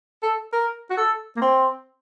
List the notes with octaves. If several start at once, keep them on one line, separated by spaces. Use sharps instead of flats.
A4
A#4
F#4
A4
A#3
C4